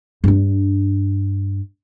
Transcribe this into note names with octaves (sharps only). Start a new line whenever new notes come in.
G2 D4